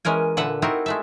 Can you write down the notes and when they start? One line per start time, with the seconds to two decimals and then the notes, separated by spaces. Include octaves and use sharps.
0.05 E3 G#3 C#4 A#4 G#5
0.37 A#2 D3 B4 E5 F#5
0.62 C4 D#4 E4 F#4 A#4
0.86 G#3 A3 E5